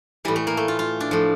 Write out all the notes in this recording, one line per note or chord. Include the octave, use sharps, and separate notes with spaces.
A2 E3 G3
A3
A#3
A3
F4
F4
D4
A2 F3